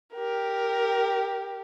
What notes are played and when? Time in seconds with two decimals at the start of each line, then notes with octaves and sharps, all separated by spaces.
0.14 G4 A#4